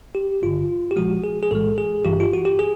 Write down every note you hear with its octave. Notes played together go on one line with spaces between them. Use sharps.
G4
G#1 G2 D3 F4
G4
A#1 A#2 F3 G#3 F#4
G#4
G#4
B1 A2 E3 G#3 A4
G#4
G1 G2 E3 G4
F4
F#4
G4
G#4